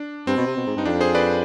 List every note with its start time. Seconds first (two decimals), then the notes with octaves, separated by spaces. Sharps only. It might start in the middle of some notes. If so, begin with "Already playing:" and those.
Already playing: D4
0.27 G2 C4
0.37 B2
0.47 C3
0.57 B2
0.66 G#2
0.76 G2 D#4
0.85 F2 D4
1.01 G#4 C5
1.15 B4 D5